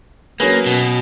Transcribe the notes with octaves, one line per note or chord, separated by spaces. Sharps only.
F#3 A#3 C#4 G#4 B4
B2